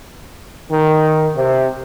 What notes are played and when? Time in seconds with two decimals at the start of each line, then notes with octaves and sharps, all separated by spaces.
0.71 D#3
1.36 C3